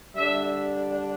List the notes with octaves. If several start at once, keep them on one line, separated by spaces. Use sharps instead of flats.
D3 G3 D4 E5